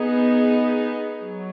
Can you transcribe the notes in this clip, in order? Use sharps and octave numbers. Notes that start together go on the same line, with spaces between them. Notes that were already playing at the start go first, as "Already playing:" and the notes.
Already playing: B3 D#4 G#4 D#5
F#3